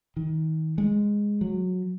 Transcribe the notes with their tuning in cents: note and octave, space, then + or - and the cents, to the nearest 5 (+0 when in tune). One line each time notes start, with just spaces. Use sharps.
D#3 +30
G#3 -10
F#3 -15